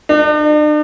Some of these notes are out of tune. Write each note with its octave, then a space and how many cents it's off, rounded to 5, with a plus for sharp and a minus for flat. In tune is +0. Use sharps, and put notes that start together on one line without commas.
D4 +45